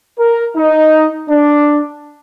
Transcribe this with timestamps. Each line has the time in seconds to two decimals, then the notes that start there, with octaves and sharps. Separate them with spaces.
0.19 A#4
0.56 D#4
1.29 D4